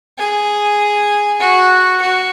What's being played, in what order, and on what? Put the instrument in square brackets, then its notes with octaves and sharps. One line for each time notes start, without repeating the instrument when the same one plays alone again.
[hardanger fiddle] G#4
F#4
F#4